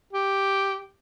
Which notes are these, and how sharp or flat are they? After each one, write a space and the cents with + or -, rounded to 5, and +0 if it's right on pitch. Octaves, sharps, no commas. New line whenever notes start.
G4 +0